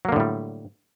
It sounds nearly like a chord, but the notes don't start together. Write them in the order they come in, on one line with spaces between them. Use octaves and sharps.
F#3 A#3 D3 A2 G3